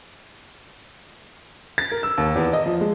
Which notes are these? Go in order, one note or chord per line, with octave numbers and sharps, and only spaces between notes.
A6
A#4
E6
D#2
E2
D#5
F3
G#3